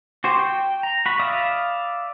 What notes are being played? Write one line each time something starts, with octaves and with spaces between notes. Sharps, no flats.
F#4 G4 C5
G5
A#5
F#4 B5
D5 E5 F5 B5 D#6